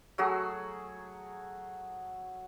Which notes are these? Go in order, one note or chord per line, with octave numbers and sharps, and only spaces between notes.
F#3 A3 F#4 G#4